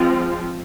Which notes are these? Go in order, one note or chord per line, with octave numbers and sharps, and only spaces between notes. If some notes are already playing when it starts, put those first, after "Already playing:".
Already playing: F3 G#3 C4 F4